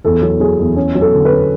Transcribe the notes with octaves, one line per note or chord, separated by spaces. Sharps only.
E2 A4
F#3
F#3 G#4
E2
C#4
F#3
A4
D3
B4
C#4